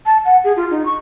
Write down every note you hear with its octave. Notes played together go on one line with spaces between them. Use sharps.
A5
F#5
G#4
F4
D#4
C#6